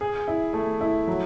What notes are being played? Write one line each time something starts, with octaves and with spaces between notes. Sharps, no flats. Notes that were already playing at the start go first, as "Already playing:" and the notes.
G#4
E4
A3
E4
F#3